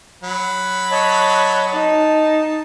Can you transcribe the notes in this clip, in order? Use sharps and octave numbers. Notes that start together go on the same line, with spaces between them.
F#3 B5
C#5 D#5 A5
D#4 A5